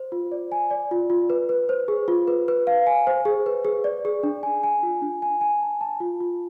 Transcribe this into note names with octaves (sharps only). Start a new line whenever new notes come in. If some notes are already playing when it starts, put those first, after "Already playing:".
Already playing: C5
F4
D5
G#5
D5
F4
F4
B4
B4
C5
G#4
F4
B4
B4
F5
G#5
C5
G#4
B4
G#4
D5
G#4
D4
G#5
G#5
F4
D4
G#5
G#5
A5
A5
F4
F4